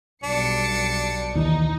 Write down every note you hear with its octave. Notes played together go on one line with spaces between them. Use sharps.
B1 G3 D4 C#7
D#2 E3 D#4